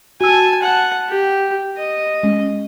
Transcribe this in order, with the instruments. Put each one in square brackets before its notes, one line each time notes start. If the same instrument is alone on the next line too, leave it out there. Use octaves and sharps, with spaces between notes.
[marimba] F#4 E6 [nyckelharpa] G#5 A5
[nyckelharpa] F#5 A5
G4
D#5
[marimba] G#3 C#4